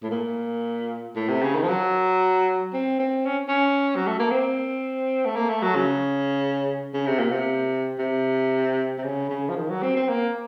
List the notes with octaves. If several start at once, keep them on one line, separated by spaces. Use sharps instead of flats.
A2
A#2
A2
C3
C#3
D#3
F3
F#3
C4
C4
C#4
C#4
F#3
A3
A#3
C4
A3
A#3
A3
F#3
C#3
C#3
C3
A#2
C3
C3
C3
C#3
C#3
F3
D#3
F#3
C4
C4
A#3